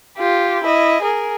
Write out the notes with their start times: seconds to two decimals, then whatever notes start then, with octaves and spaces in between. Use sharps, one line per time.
0.18 F4 G4
0.63 E4 D#5
1.02 G#4 A#4